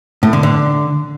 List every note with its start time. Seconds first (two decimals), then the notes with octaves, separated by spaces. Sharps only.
0.23 A2
0.33 D3
0.43 D3